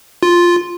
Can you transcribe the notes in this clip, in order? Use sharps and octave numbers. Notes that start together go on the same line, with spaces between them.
F4